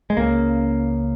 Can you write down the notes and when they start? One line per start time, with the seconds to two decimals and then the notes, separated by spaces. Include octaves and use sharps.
0.10 G#3
0.17 C#2 C#3 A#3